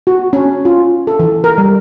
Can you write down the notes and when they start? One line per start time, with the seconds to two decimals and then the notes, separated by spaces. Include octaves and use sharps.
0.07 F#4
0.33 C#4
0.65 F4
1.07 A4
1.19 E3
1.44 A#4
1.58 G3